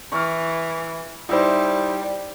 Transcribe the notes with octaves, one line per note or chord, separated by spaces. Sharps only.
E3 C#6 F6
G3 D#4 E4 C5